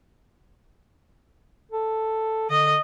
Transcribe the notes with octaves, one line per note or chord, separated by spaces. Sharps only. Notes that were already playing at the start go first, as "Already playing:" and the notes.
A4
D3 D#5